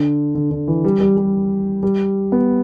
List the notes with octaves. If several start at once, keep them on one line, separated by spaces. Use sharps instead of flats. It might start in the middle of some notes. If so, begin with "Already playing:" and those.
Already playing: D3
D3
D3
E3
G3
G3
G3
G3
B3